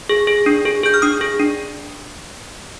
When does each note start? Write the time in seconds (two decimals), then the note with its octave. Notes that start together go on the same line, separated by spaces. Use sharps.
0.09 G#4
0.27 G#4
0.46 D4
0.65 G#4
0.83 G#4 G6
0.94 F6
1.02 D4 D#6
1.21 G#4
1.40 D4